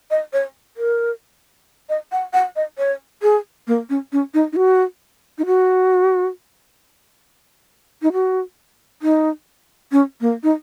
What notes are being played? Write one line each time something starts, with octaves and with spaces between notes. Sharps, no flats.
D#5
C#5
A#4
D#5
F#5
F#5
D#5
C#5
G#4
A#3
C#4
C#4
D#4
D#4
F#4
D#4
F#4
D#4
F#4
D#4
C#4
A#3
D#4